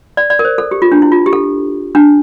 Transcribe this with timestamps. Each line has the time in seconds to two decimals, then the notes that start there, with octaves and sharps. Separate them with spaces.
0.17 D5
0.30 D5
0.39 A#4
0.45 C5
0.58 A4
0.71 G4
0.82 F4
0.92 D4
1.02 E4
1.12 F4
1.26 G4
1.33 A4
1.95 D4